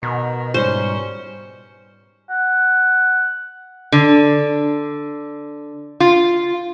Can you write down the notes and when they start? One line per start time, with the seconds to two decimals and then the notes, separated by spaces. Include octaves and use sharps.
0.03 B2 D#3
0.54 G#2 G3 C#4 C5
2.30 F#5
3.92 D3
6.00 F4